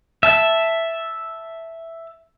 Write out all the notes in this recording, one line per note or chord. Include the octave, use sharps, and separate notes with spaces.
E5 A5